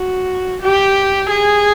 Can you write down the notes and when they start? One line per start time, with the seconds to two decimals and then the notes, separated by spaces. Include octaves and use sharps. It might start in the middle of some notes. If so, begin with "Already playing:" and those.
Already playing: F#4
0.62 G4
1.31 G#4